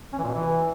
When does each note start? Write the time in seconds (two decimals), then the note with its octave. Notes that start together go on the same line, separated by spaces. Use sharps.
0.13 C#4
0.18 E3
0.23 A#2
0.28 B2
0.34 E3